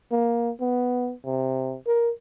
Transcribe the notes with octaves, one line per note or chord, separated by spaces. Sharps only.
A#3
B3
C3
A#4